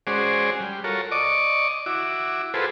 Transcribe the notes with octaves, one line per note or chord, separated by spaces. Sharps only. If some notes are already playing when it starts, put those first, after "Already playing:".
G#3 C#4 F#4 G#4 C5 D5
G3
F4 F#4 A4 A#4 C#5
D5 D#5 C#6 D6
E4 F#4 D6
F4 F#4 G#4 A4 B4 C5